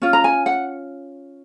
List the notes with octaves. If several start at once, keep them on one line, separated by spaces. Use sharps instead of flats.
C#4 F4
A#5
G#5
F#5